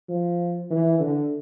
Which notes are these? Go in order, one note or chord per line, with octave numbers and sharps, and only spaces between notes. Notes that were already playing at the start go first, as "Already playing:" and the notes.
F3
E3
D3